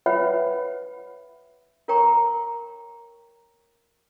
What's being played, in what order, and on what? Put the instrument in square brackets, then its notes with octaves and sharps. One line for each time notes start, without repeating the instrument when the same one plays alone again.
[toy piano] B4 C#5 E5 F#5 G5 B5
F4 A#4 C#5 G5 A#5 C#6